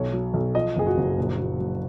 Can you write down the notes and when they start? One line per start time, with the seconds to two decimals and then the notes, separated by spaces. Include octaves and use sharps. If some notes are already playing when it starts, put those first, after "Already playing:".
Already playing: B1 C#5
0.13 F#3
0.34 B1
0.55 F3 D#5
0.76 F#1 G#4
0.87 F#4
0.97 F#1
1.17 A#1
1.39 F#3
1.60 F#3